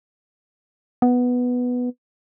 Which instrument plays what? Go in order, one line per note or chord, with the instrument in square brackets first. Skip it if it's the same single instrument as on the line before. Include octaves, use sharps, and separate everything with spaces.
[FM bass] B3